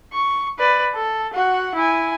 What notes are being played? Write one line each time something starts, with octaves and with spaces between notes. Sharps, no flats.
C#6
B4 D5
A4
F#4 F#5
E4 G#5